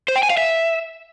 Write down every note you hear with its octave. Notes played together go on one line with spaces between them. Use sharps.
C5
G5
G#5
F5
E5